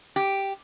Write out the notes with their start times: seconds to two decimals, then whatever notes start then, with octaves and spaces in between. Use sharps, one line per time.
0.16 G4